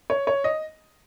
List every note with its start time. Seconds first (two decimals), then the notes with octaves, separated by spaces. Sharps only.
0.10 C#5
0.27 C#5
0.44 D#5